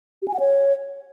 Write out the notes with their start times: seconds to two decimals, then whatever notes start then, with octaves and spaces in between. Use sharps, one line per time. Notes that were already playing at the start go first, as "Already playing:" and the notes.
0.22 G4
0.28 G#5
0.34 F#5
0.40 C#5